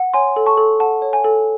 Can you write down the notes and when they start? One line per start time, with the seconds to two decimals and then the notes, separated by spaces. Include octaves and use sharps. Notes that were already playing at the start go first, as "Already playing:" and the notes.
Already playing: F#5
0.14 C#5 G#5 C6
0.36 A4
0.46 A5 C#6
0.57 A4
0.80 F#5 A5
1.02 C#5
1.13 G#5
1.24 A4